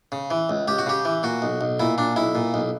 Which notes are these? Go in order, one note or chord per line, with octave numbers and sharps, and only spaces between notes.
C#3
E3
C#2
C#2 G4
F#4
C#3 G4
E3
A#2 F#4
B1
B1
A#2 E4
A#2 D4
B1 E4
A#2
B1